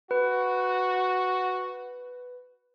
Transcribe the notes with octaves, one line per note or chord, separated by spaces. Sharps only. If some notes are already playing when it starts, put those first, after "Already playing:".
F#4 B4